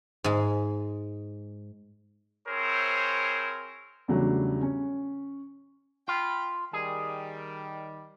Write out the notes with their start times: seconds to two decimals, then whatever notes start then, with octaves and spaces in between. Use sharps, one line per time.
0.24 G#2 G#3
2.48 C4 E4 G#4 A#4 C5 C#5
4.08 E2 C#3 F#3 G3 A3 D4
4.62 C#4
6.08 F4 G5 B5
6.73 D#3 G3 G#4